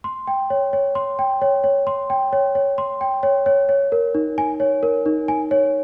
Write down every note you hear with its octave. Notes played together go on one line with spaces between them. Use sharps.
C6
G5
C#5
C#5
C6
G5
C#5
C#5
C6
G5
C#5
C#5
C6
G5
C#5
C#5
C#5
A#4
D#4
G#5
C#5
A#4
D#4
G#5
C#5